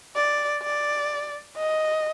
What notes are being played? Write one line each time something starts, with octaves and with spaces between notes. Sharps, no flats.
D5
D5
D#5